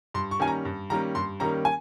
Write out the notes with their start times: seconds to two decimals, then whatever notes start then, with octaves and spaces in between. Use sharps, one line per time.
0.14 G2 C6
0.31 C#6
0.39 D#3 G3 A#3 C#4 G#5
0.47 A#5
0.65 G2
0.90 D#3 G3 A#3 C#4 A#5
1.15 G2 C6
1.40 D#3 G3 A#3 C#4 A#5
1.65 G#5